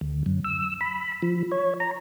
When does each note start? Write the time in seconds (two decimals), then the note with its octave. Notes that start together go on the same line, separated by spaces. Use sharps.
0.01 D2
0.26 F#2
0.44 E6
0.81 B5
1.22 F3
1.52 C#5
1.80 A#5